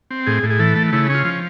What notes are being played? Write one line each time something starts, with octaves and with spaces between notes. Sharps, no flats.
C4
A2 G#4
A2
G#4
E3 A4
A3
C#3 E4
C#4 F4
F3